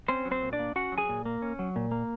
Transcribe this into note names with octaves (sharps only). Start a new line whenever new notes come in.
C4 C#4 C5
F#3
C4 C5
A#2
D4 D5
A#3
C#4 F#4 F#5
F#3
G#4 G#5
A#2
A#3
C#4
F#3
A#2
A#3